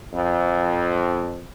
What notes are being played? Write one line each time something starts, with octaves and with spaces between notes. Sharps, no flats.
F2